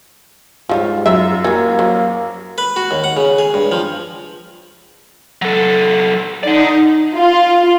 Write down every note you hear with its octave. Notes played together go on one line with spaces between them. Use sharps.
G#2 F3 G3 F4 C#5
F#2 E5
E3 G3 A#3 G#6
F3 F#3
B4
F#4
D#2
F#5
C#3
G#4
G2
F3
F#3 A4
D#4 D5 F#5
F4